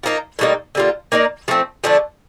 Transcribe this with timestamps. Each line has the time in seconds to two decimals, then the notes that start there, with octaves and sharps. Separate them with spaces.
0.03 F3 A#3 D#4
0.39 A2 G3 A#3 D#4
0.75 D3 G3 A#3 F4
1.12 A#3 D#4 A#4 D5
1.48 F3 A3 C4
1.84 D3 F3 A3 D4